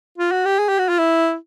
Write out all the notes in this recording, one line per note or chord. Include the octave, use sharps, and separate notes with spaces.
F4
F#4
G4
G#4
G4
F#4
F4
E4